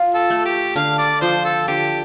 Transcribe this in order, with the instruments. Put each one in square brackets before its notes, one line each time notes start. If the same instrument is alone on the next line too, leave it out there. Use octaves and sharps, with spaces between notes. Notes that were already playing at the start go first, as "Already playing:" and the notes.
Already playing: [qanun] F4
[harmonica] A4
[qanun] A3
[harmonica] G4
[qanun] D3 [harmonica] F5
[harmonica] D5
[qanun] F3 [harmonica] C5
[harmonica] A4
[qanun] D3 [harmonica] G4